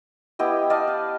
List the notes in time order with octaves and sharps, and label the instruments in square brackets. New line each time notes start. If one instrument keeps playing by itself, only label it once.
[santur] B3 E4 G4 D#5
D5 D#5 F5 A5
F5